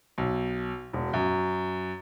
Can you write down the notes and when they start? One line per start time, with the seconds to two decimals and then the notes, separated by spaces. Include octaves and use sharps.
0.18 B1
0.93 E1
1.13 F#2